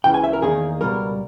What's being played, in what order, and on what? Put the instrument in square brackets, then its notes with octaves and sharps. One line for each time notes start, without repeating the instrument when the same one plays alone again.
[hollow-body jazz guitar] C#2 C#3 E3 G5
G#5
E5
A#4
E2 D#3 A#3 D#4 G#4
C#2 B2 G3 A#4